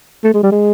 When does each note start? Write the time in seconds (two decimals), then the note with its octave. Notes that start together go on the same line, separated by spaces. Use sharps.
0.24 A3
0.34 G#3
0.43 G3
0.52 G#3